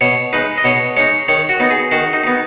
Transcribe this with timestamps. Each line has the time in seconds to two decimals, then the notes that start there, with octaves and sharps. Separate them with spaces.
0.01 B2 C#5
0.33 G#3 D#4 B4
0.58 D#5
0.64 B2 C#5
0.97 G#3 D#4 C#5
1.28 D#3 C#5
1.49 F#4
1.60 B3 D#4
1.71 G#4
1.92 D#3 F#4
2.13 D#4
2.24 B3 D#4